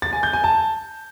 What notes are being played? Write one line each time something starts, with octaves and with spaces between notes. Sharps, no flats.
A6
G#5
G6
G#5
A5